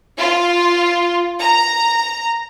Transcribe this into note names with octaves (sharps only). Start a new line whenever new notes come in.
F4
A#5